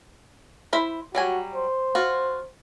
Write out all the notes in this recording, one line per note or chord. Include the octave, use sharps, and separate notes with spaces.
E4 C5 B5
F#3 G3 F#4 G#5
C5
F4 F#4